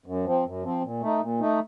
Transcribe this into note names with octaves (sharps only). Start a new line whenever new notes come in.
F#2
F3 C4
F#2
F3 C4
A#2
A3 D#4
A#2
A3 D#4